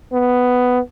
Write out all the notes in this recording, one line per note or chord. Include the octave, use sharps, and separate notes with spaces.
B3